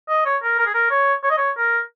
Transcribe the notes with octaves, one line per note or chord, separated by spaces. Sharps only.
D#5
C#5
A#4
A#4
G#4
A#4
C#5
C#5
D#5
C#5
A#4